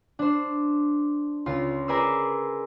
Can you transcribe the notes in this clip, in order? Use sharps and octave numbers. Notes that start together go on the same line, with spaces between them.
D4 C5
C#2 F4 C6
G#4 A#4 B4 D5 C6 E6